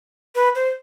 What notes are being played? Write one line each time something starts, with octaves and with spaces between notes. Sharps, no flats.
B4
C5